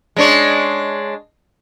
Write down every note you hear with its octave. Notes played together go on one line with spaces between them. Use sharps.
G#3 D4 C#5